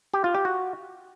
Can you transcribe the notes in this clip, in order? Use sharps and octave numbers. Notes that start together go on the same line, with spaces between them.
G4
F4
G4
F#4